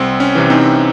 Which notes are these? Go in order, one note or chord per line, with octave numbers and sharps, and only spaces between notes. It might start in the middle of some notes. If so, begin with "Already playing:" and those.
Already playing: C2 C4
C#4
C3 E3
C4 D#4